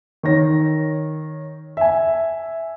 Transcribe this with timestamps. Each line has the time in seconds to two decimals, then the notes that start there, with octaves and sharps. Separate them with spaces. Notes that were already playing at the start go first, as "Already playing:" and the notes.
0.23 D#3 C#5 A#6
1.77 E5 G#5